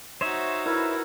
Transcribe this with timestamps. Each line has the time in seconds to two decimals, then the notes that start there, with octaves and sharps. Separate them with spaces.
0.21 D#4 F#4 C5 C#5 E5
0.65 E4 A#4 B4